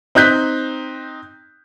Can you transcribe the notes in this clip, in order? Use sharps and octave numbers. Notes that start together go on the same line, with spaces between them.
C4 D#4 F#6 G6 B6